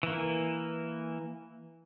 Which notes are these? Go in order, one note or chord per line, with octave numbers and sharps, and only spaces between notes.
E3 A#3